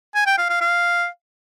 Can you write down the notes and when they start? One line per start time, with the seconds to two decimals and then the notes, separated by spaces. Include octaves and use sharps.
0.15 G#5
0.26 G5
0.38 F5
0.49 F5
0.61 F5